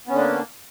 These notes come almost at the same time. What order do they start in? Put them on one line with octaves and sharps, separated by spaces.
B3 C#4 D3 D4 A#3